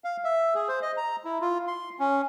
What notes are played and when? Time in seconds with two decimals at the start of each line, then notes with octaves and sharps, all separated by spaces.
0.04 F5
0.24 E5
0.55 G#4
0.68 C5
0.82 D#5
0.97 A#5
1.25 E4
1.41 F4
1.67 C6
1.99 C#4